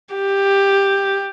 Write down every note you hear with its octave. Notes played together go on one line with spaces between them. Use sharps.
G4